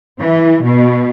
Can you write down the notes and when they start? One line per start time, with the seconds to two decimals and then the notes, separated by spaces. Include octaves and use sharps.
0.20 E3
0.63 B2